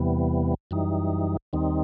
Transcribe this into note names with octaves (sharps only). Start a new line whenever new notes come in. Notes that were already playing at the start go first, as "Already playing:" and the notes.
Already playing: E2 C3 E3 G3 B3
F#2 E3 G3 D#4
D#2 D#3 G3 C4 D#4